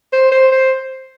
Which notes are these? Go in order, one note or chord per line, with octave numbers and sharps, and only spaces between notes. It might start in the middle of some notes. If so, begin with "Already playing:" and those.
C5
C5
C5